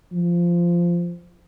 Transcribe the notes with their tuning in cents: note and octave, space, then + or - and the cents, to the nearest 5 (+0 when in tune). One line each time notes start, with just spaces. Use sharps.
F3 -10